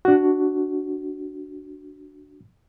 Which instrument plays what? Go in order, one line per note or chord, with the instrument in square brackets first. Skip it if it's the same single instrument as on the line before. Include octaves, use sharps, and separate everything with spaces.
[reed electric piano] D4 F#4